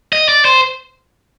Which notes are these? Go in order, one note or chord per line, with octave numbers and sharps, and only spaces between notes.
D#5
D5
C5